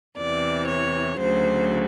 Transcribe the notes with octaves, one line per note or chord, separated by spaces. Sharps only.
E2 C3 E3 D5
C#5
D2 C#3 F#3 C5